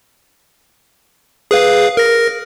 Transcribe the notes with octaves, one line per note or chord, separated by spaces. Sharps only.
G#4 B4 F5
A#4 A#6